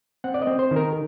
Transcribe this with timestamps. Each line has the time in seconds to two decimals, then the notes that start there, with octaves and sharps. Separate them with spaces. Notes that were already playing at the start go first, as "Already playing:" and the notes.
0.24 C4 F#5
0.34 D5
0.42 D#5
0.47 C4
0.59 C5
0.71 D#3
0.76 A#4